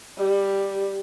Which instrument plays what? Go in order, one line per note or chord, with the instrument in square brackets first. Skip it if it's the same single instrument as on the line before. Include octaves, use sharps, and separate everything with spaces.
[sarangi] G3